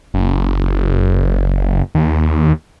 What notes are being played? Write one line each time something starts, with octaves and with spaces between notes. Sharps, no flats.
F#1
D#2